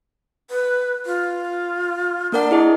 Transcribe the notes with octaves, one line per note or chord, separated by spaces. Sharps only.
B4
F4
A#3 D4 A#4 F#5
E4 G#4 D#5